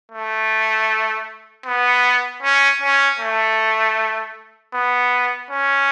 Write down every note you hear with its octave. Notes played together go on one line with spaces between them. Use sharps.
A3
B3
C#4
C#4
A3
B3
C#4